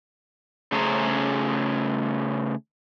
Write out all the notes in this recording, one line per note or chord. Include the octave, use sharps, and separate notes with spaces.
C#3 A3 C#4 G#4 C5 A#5